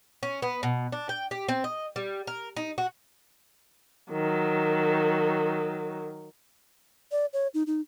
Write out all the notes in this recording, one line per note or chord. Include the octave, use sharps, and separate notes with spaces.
C#4
B3
B2
D4
G5
G4
C4
D#5
G3
A#4
D#4
F#4
D#3 F#3
D5
C#5
D#4
D#4